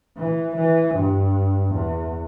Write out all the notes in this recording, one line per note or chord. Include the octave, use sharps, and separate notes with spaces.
E3
E3
G2
E2